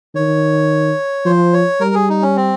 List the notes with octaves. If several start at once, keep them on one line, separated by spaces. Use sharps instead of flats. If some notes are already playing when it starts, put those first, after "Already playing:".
D#3 C#5
F3 C5
C#5
G3 A#4
G#4
D#4
C#4
C4